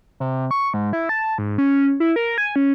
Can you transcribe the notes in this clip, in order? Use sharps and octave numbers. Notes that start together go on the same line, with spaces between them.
C3
C#6
G#2
E4
A5
G#2
C#4
E4
A#4
G#5
C#4